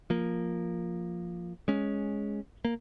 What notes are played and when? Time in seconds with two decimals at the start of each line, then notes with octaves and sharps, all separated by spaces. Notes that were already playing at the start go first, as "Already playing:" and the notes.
0.10 F3 A#3
1.68 G#3 C#4
2.65 A#3